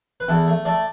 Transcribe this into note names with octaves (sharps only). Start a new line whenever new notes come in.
B4
E2 E4 A4
A3
A3 A4 D5